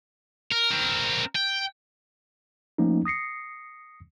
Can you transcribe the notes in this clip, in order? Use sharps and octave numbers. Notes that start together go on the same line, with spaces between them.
A#4
C4 A#4
G5
F3 A3 A#3 C#4 D#4
D#6 A#6 C7 C#7